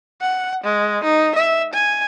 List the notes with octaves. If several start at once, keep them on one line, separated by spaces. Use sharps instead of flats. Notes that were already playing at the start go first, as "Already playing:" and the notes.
F#5
G#3
D#4
E5
G#5